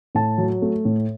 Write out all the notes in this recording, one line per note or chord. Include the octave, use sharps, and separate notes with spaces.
A2 A5
F#3
A3
A2